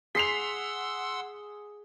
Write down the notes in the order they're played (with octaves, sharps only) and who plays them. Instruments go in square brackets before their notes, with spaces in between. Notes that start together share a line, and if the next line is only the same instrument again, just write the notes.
[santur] G#4 D6 [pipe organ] F#5 C6 E6 [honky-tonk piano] B6 C7 F7